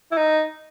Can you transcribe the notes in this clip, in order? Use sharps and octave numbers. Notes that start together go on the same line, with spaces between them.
E4
D#4